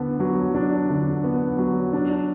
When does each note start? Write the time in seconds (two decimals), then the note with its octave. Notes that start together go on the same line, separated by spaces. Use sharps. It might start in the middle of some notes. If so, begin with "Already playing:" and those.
Already playing: D3 B3
0.20 F#3
0.54 D4
0.89 D3
1.24 B3
1.58 F#3
1.93 D4